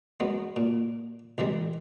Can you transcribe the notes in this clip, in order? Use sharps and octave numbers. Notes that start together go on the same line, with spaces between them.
F#2 G#3 B3
A#2
C2 E3 G3 G#3